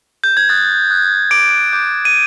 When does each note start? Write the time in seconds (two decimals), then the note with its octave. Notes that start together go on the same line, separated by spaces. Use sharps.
0.24 G6
0.37 G#6
0.49 D#6 F#6 A6
0.90 D#6 F#6
1.31 D6 G6 D7
1.73 D6 G6
2.05 D#7